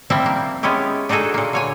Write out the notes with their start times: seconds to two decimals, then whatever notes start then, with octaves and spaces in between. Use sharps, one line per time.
0.10 F3 G3 C4 E4 G5 A5
0.26 A#3
0.63 G#3 B3 C#4 E4 G4
1.09 D4 D#4 F#4 G#4 A4
1.34 A#2 A#3
1.53 D3 C#5 G#5